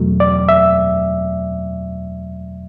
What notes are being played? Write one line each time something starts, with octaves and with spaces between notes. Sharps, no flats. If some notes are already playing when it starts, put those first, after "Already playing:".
Already playing: E2 B2 F#3 A3
D5
E5